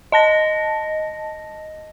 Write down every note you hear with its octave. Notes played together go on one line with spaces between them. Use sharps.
D#5 A5 A#6